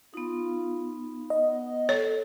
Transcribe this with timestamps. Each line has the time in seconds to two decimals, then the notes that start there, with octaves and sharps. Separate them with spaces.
0.14 B3 D#4 F4
1.30 B3 D#5
1.89 A4 C#5